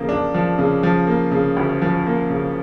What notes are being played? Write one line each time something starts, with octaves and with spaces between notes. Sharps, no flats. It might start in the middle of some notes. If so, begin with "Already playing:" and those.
Already playing: C#3 F3 A#3
D4
F3
C#3
F3
A#3
C#3
D2
F3
A#3
C#3